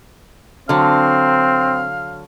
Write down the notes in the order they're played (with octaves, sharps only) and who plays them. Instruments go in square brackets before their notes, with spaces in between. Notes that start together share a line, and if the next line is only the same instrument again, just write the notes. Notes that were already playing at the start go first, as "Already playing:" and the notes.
[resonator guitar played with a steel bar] D3 F#3 [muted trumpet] C4 [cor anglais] F5